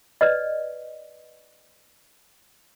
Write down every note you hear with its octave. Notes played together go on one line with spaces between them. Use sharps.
B4 D5 D#5